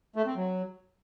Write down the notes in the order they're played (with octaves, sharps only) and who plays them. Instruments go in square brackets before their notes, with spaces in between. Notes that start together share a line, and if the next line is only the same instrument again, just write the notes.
[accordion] A3
C4
F#3